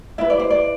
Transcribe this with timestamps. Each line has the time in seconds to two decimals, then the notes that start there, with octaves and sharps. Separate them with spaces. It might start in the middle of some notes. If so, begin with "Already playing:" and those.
0.18 E4 B4 E5
0.30 D5
0.40 C5
0.50 D5